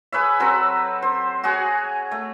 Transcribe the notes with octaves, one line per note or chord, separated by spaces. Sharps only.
G#4 B4 C#5 E5
F#3 C4 A4 B4
C5
F#4 G#4 C#5 G#5
A3